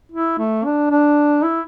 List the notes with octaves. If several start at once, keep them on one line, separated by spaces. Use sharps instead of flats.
E4
A3
D4
D4
E4